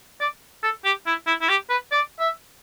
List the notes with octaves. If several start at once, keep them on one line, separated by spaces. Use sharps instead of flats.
D5
A4
G4
E4
E4
E4
G4
B4
D5
E5